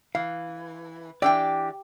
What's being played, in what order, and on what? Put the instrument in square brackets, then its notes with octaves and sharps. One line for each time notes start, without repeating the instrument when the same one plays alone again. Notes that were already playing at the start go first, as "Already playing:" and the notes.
[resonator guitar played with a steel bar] E3 [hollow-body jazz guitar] F5
[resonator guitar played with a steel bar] E3 D4 G5 [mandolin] G4 [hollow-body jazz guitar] D5